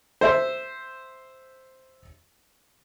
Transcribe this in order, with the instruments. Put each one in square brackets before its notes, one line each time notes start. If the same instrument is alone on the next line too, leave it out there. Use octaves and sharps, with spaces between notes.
[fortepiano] C5 E5